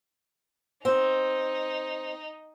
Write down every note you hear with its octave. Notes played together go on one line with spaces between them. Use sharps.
C4 D#4